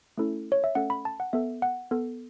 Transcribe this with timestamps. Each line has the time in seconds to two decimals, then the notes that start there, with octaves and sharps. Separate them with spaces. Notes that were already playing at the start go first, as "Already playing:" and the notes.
0.18 A3 C#4 E4 A4
0.52 C#5
0.64 E5
0.75 A3 C#4 A4 F#5
0.90 B5
1.05 A5
1.20 F#5
1.33 B3 A4 E5
1.62 F#5
1.91 B3 A4